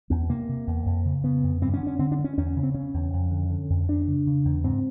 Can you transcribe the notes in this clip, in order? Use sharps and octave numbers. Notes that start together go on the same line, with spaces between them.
E2 B3
C3 A#3
C3
E2
F2
C#3
C#3 B3
F2
G2 C4
C#4
D3
C#4
D3 C4
D4
G2
C#4
E2 C#4
C#3
C4
C#3 C#4
E2
F2
D3
D3
F2
E2 D4
C#3
C#3
E2
G#2 C4